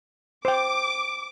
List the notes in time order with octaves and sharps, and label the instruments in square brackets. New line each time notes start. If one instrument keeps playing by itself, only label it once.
[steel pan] C5 G5 [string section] D6